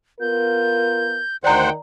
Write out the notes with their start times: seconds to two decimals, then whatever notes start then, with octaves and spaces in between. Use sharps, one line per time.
0.20 B3 F4 A#4 G6
1.44 D2 D#3 C5 D5 F#5 G5 A#5